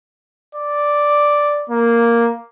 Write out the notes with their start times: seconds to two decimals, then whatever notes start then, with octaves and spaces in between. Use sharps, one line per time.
0.55 D5
1.70 A#3